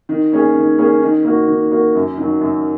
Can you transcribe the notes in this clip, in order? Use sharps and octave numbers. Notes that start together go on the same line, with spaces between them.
D#3
A#3 C#4 G#4
D#3
A#3 C#4 G#4
D#3
A#3 F#4
D#3
A#3 F#4
F#2
D#3 F#3
F#2